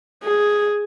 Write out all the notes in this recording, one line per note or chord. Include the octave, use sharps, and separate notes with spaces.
G#4